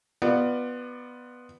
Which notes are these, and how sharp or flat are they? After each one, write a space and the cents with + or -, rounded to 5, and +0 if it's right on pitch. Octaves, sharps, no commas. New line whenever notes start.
B3 +0 F4 +0 D5 +25